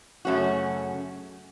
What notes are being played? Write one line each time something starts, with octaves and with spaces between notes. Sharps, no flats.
F#2 C#3 A3 C#4 F#4